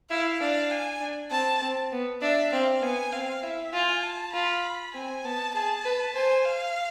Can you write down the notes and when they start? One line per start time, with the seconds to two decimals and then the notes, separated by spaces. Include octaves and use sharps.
0.10 E4 F5
0.40 D4 F5
0.71 G#5
1.01 D4
1.31 C4 A5
1.62 C4
1.92 B3
2.22 D4 E5
2.52 C4 F5
2.82 B3 G#5
3.13 C4 F5
3.43 E4 E5
3.73 F4 G#5
4.03 A5
4.34 F4 B5
4.94 C4 G#5
5.25 B3 A5
5.55 G#4 A5
5.85 B4
6.15 C5 G#5
6.45 F5